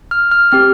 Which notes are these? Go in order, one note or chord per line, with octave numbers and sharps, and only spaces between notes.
F6
F6
C4 G4 F6